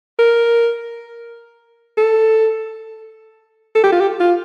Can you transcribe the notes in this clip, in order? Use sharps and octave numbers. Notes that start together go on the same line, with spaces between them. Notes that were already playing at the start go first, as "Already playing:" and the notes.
A#4
A4
A4
G4
F4
G4
F4